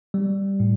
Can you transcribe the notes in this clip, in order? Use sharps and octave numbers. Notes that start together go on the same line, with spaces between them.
G3
A2